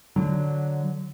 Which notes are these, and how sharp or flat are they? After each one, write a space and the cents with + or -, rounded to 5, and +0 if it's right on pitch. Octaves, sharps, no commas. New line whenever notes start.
D3 +0 F#3 +0